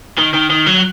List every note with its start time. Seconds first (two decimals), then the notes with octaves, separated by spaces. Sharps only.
0.18 D#3
0.34 D#3
0.50 D#3
0.66 F#3